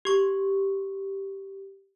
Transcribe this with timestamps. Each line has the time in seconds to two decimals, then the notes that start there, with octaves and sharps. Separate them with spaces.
0.05 G4 C#6